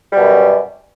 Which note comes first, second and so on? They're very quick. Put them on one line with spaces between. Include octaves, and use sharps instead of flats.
G3 B2 F#2